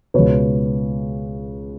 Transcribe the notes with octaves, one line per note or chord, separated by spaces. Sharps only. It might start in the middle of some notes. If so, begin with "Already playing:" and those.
C#2 B2 B4 C#5